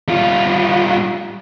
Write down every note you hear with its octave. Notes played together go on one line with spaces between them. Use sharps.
G3 F4